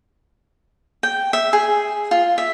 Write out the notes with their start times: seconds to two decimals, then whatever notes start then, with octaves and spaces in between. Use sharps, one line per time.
1.03 G5
1.33 E5
1.53 G#4
2.11 F4
2.38 E5